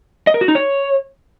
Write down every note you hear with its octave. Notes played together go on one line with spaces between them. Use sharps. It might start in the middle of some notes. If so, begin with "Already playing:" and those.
D#5
A#4
F#4
D#4
C#5